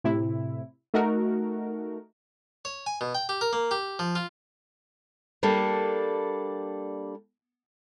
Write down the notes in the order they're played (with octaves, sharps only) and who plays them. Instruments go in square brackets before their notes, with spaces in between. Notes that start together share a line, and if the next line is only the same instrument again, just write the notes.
[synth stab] A2 C3 E4
A3 D#4 F#4 A#4
[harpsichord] C#5
G#5
B2
G5
G4
A#4
A#3
G4
F3
F4
[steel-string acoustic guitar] G3 A#3 D4 A4